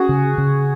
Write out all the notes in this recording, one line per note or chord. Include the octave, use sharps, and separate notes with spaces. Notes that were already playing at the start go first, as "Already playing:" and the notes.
Already playing: C#4 F#4 G#4
C#3
C#3